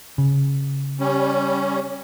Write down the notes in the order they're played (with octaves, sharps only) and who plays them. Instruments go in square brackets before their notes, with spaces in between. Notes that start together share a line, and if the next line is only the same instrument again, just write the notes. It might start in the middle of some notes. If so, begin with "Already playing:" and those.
[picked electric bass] C#3
[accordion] G3 C#4